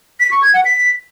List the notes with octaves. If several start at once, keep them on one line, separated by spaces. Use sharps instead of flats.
B6
C#6
G#6
F#5
B6